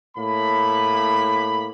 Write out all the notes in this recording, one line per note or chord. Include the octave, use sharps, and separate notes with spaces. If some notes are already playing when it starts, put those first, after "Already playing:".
A2 A#3 B5